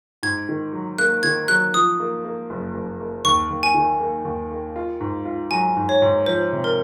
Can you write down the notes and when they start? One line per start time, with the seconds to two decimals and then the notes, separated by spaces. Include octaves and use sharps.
0.23 G#2 G#6
0.49 D#3
0.73 F#3
0.98 A#3 F#6
1.23 D#3 G#6
1.48 F#3 F#6
1.74 F3 D#6
2.00 A#3
2.25 A#3
2.50 F#1
2.74 F#1
3.00 A#3
3.25 D#2 C#6
3.50 D#2
3.63 G#5
3.74 D#3
4.00 A#3
4.25 D#2
4.51 A#3
4.76 F4
5.00 G#2
5.25 F4
5.51 F#3 G#5
5.77 G#2
5.89 C#5
6.02 G#2
6.26 F3 C5
6.52 C3
6.64 A#4